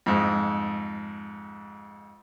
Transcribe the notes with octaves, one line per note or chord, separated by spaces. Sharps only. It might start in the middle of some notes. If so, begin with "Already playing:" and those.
F2 G#2